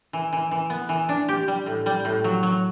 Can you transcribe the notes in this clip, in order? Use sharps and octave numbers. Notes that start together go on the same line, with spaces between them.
E3
E3
E3
B3
E3
D4
G4
G3
A2
G3
A2
F#3
F#3